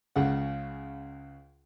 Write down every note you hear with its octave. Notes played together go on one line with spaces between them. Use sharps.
C#2 C#3 F#5